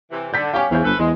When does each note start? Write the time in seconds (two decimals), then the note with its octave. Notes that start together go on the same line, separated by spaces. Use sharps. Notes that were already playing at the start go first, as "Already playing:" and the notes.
0.12 C3 E3
0.33 D3 D5 G6 B6
0.53 C#4 G4 F5 G#5
0.71 E2 C#3 E3 C5 G#5 G6
0.85 G1 A2 A4 B4
0.99 E2 G#3